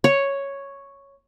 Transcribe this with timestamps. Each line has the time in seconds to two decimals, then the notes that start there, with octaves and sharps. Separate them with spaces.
0.04 C#5